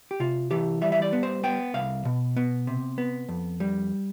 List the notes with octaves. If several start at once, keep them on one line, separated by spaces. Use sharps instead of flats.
G4
C3 F4
E3 G4
G3 E5
E5
D5
B3
C5
B3 G5
C2 F5
B2
B3
C3
B3
F2
G3